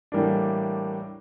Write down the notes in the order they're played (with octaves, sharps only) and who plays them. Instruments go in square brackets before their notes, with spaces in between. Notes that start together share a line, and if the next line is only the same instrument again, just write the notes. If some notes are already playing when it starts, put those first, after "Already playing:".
[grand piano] A2 E3 G3 A#3 D4